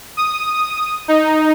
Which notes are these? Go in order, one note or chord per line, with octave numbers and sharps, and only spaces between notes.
D#6
D#4